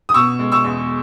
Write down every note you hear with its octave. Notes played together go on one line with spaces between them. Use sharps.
D#6
B2 C#6 E6
G#3
C#6 E6
E2